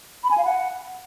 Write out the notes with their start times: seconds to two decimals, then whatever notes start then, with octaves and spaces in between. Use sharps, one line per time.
0.24 B5
0.31 G#5
0.38 F5
0.45 F#5